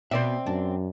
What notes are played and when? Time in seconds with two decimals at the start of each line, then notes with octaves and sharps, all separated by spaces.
0.11 B2 B3 C4 C5 D5 E5
0.46 F#2 D4